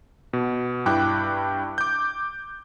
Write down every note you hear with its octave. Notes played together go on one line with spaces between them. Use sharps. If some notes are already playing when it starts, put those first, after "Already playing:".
B2
G2 E4 G5 D6 F#6
D6 G6